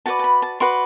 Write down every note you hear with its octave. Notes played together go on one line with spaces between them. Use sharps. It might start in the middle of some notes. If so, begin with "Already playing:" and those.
F#4 B4 D5 A5
A5
B5
A5
F#4 B4 D5 C6